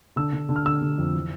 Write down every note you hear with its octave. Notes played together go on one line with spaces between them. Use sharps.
D3 E6
D3
D3
F6
D3 E6
D3
F2
E3